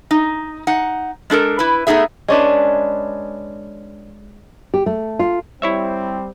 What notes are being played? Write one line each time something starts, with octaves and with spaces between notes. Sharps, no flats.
D#4
D#4 F#5
G#3 D4 A4 A#4
E4 B4
A3 B3 D#4 G#4 E5
G#3 C#4 D4 B4
G4
A3
F4
G3 C4 E4 C#5 E5